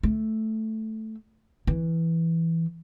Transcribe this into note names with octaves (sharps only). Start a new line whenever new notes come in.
A3
E3